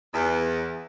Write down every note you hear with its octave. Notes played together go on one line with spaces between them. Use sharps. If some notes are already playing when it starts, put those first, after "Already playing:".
E2